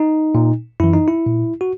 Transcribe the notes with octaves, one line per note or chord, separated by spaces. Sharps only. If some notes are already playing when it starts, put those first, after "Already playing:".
Already playing: D#4
A#2
F#2 E3 E4
D#4
E4
A#2
F#4